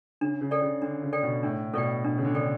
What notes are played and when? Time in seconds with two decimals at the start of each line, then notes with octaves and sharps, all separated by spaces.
0.21 C#3 D4
0.41 C#3
0.51 A4 D5 G5
0.61 C#3
0.82 D3 D4
1.02 C#3
1.13 A4 D5 G5
1.23 B2
1.43 A2 D4
1.73 B2 A4 D5 G5
2.04 B2 D4
2.17 C#3
2.25 D3
2.35 A4 D5 G5